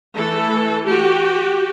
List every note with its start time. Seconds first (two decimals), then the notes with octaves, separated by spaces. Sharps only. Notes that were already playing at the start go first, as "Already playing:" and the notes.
0.16 E3 A3 A4
0.85 F#4 G4